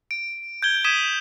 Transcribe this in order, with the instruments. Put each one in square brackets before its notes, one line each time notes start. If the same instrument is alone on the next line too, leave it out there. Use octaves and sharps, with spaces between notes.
[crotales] D7
G6 G#6 G7
D#6 G#6 B6 D#7 E7